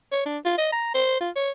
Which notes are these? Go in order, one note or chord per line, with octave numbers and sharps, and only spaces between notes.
C#5
D4
F4
D#5
A#5
C5
F4
C#5